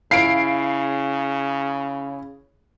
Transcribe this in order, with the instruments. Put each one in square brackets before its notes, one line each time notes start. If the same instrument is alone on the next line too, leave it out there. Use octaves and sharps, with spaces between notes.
[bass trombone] C#3 [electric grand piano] E4 F5 [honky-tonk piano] C7 D7